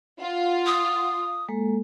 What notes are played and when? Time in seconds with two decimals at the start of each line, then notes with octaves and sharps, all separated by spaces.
0.20 F4 F#5
0.66 D#6
1.49 G#3 A#3 A4